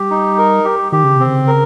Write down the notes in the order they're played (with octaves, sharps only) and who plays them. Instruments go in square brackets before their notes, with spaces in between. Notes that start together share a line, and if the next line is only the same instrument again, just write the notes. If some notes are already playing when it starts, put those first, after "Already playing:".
Already playing: [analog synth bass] G3 [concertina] G4
[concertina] D#4
A#4
G4
[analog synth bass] D#3 [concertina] G4
[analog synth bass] C#3
[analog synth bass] C3 [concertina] C4
[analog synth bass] C#3
[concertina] A#4